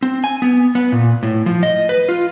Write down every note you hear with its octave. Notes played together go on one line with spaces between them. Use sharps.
C4
G#5
B3
B3
A#2
A2
F3
D#5
B4
F4